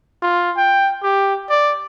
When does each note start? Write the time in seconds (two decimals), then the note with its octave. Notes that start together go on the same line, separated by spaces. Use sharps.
0.22 F4
0.57 G5
1.03 G4
1.50 D5